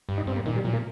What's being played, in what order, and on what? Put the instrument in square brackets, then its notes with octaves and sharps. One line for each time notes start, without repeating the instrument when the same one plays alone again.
[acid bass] G2
[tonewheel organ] D#4
[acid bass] G2 [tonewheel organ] C4
[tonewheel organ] A#3
[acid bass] A#2 [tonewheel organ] D#3
[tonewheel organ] G3
[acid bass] A#2 [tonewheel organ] F3
[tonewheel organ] A#3